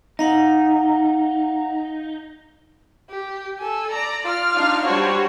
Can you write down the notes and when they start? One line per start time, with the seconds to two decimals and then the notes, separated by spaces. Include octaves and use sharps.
0.19 D#4 D#5 F5 F#5
3.10 G4
3.59 A4 G#5
3.91 D5 A#5
4.24 F4 F6
4.54 D4 D#4 F5
4.86 G3 D4 F#4 C5 C#5